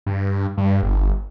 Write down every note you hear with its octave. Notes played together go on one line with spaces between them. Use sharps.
G2
G2
G1